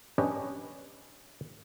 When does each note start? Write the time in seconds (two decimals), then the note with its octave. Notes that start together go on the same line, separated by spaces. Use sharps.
0.18 C#4 D4 G4 B4 C#5 D#5